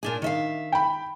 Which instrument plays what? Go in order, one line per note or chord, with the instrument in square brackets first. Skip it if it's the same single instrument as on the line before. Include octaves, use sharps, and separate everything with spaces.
[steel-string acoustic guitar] A#2 D4 G#4
D#3 E5 F5
[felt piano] G5 B5